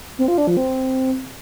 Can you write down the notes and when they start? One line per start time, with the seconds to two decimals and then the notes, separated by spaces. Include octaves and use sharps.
0.19 C4
0.28 F4
0.38 D4
0.47 F3
0.57 C4